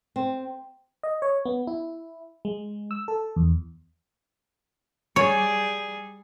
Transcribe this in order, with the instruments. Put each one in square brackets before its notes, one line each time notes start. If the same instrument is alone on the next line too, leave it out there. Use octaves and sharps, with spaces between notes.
[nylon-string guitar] C4
[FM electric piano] D#5
C#5
B3
E4
G#3
E6
A4
E2
[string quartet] G3 G#4 [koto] C#5